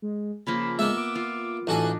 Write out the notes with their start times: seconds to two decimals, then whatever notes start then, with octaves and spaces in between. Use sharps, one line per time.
0.02 G#3
0.47 C#3 F3 A#3 B5
0.79 G#3 A#3 B3 E5
0.97 D6
1.15 F4
1.67 A1 D4 D#4 F#4 A4 G#5